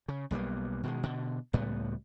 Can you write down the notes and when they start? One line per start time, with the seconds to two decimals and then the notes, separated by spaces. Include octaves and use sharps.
0.08 C#3
0.31 B1 G3 A#3 B3
0.83 B2 D#3 G#3
1.03 B2 D3
1.53 C#2 A2 G3 B3